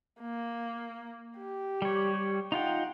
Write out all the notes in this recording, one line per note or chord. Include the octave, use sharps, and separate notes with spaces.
A#3
G4
G3 C#5
D#4 F4 F#5 G5